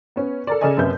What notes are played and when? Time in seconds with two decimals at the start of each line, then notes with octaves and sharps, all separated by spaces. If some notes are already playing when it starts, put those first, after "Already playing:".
0.16 B3 C#4
0.47 A4 A#4 D5
0.61 C#3 A4 D5 D#5 G#5
0.77 F#1 F#2 C3 B4 E5 G6